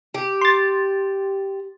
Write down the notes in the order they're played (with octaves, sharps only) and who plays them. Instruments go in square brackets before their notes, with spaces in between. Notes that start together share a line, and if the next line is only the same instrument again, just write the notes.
[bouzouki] G4
[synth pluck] C6 A6